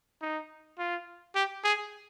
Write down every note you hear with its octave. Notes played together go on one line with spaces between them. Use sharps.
D#4
F4
G4
G#4